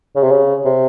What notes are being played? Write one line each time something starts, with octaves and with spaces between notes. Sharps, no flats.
C#3
C3
C#3
C3